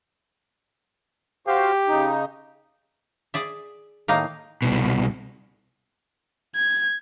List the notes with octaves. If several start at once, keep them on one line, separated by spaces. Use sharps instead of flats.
F#4 G4 C5 F5
C#3 D#4
G#4 D5 E5
A2 D#3 A#3 D#4 F5
C2 B2
G#6